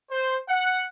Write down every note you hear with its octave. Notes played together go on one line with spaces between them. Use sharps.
C5
F#5